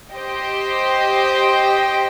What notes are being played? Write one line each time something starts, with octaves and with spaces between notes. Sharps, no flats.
G4 C5 D#5 G5